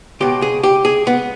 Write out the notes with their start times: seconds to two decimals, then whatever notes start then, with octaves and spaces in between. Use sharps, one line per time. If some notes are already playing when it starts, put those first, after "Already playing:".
0.20 C#2 B2 G4
0.42 G#4
0.63 G4
0.85 G#4
1.07 B3